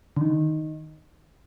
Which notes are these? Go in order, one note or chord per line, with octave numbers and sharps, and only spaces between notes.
D3
D#3